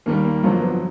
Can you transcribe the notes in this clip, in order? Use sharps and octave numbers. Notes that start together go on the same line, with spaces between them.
D#2 D#3 G3 A#3
A#3
G1 F2 D3 F#3 A#3
B3